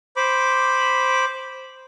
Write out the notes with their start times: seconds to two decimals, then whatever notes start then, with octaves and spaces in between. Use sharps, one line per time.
0.16 C5 B5 D6